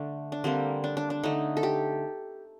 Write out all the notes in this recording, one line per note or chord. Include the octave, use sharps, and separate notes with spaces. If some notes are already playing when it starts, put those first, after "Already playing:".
Already playing: D3 A3 D4
D4
D3 G3 A#3 C4
D4
D4
D4
D3 A3 D#4
A4
G4